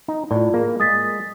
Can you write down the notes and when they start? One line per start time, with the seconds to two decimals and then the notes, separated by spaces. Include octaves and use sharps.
0.08 D#4
0.31 A2 F4 D5
0.54 A#3 G#4
0.80 G#3 D#6 A6 B6